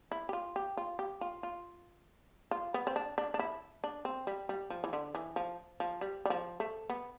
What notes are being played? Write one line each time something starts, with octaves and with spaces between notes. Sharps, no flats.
E4
G4
F4
G4
F4
G4
F4
F4
F4
B3
C4
D4
D4
D4
E4
D4
C4
G3
G3
F3
E3
D3
E3
F3
F3
G3
G3
F3
A3
B3